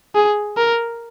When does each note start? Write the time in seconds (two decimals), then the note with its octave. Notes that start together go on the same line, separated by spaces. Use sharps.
0.15 G#4
0.57 A#4